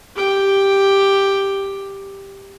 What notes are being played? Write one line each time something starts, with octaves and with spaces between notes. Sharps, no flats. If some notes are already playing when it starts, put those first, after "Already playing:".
G4 G5